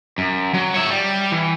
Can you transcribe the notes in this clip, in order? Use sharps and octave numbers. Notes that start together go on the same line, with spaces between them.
F#2
F#3
C#5 E5
G3
E3